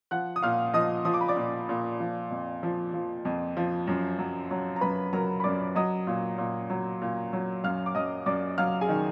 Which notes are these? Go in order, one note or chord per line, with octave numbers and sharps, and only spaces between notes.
F3 F#5 F#6
D#6
A#2 F5 F6
F3 D#5 D#6
F3 D#6
D6
B5
D5 D6
A#2
A#2
F3
F2
F3
F3
F2
F3
F#2
F#3
F#3
A#5
F#2 B4 B5
F#3 A#4 A#5
B5
F#2 D5 D6
F#3 D#5 D#6
A#2
A#2
F#3
A#2
F#3
F#2 F5 F6
D6
F#2 D#5 D#6
F#2 D5 D6
F#3 F5 F6
G#4 G#5
D#3